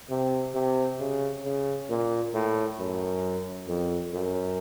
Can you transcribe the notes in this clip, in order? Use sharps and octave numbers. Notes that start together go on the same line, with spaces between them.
C3
C3
C#3
C#3
A#2
A2
F#2
F2
F#2